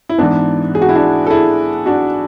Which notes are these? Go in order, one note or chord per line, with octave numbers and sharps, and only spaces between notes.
E4
G#2 E3 B3 D4
G#4
F#4
E4
D4 F#4
A4
E4 G#4
D4 F#4